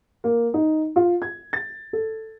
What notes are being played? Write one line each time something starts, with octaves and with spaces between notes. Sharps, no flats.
A#3
D#4
F4
G#6
A6
A4